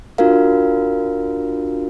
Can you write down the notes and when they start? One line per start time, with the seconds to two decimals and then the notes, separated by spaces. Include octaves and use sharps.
0.18 D4 F4 F#4 A#4 F5